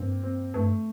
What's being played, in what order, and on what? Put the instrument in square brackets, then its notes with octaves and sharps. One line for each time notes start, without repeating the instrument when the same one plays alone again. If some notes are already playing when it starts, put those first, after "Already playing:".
Already playing: [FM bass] G2 [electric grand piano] A#3 C4
[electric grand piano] C4
[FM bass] G2 [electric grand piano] A3